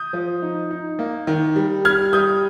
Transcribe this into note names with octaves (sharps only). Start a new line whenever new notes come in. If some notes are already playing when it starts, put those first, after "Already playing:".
Already playing: D#6 G6
F3
D#4
D#4
A#3
D#3
G3
G3 F6 G#6
G3 D#6 G6